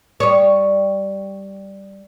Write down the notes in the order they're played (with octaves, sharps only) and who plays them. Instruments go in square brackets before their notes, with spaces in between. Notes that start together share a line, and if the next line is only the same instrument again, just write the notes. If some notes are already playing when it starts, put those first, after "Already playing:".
[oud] G3 C#5